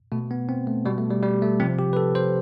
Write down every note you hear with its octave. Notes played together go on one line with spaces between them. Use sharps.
B2 A3
B3
C4
A3
B2 G3
A3
G3
G3
A3
C3 F3 C4
G4
B4
A4
C5